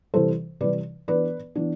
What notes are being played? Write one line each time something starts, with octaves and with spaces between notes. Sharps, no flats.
C3 E3 G3 A4 C5
C3 E3 G3 B4 D5
E3 B3 D4 B4 D5
E3 B3 D4